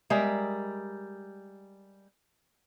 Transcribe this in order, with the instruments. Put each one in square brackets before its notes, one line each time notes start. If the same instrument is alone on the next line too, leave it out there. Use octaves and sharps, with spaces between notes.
[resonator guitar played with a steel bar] G3 G#3 A#4 E5